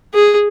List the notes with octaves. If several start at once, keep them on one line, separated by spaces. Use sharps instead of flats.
G#4